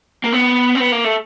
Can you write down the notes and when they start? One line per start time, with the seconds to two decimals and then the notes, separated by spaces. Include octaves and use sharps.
0.24 A#3
0.32 B3
0.75 C4
0.80 B3
0.92 A#3
1.04 A3